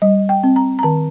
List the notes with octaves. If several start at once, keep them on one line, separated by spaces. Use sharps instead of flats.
G3 D#5
G5
C4
A#5
A#5
D#3 A5